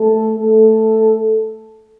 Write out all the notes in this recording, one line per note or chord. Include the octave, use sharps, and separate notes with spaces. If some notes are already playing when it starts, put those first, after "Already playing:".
Already playing: A3 A4
A3 A4